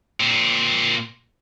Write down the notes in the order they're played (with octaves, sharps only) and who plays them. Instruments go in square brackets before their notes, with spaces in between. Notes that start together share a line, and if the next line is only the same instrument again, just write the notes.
[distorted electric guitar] A#2 C4